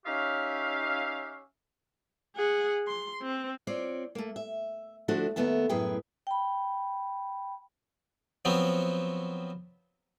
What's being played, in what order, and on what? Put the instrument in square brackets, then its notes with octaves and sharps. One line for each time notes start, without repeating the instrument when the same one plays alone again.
[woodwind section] C#4 D#4 G4 C#5 E5 F5
[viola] G#4 F#5
C6
C4
[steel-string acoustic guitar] C4 F4 C#5 D5
A3 A#3
E5
D3 F3 A3 D4 F#4 C5
D#2 G#2 A3 B3 E5 A5
F#2 A2 G#4 B4 G5
[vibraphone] G5 B5
[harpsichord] F3 F#3 B3 C4